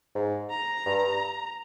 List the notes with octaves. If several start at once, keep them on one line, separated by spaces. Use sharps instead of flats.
G#2
A#5
G2